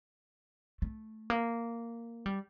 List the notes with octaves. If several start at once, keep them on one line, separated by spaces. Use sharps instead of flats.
A3
A#3
G3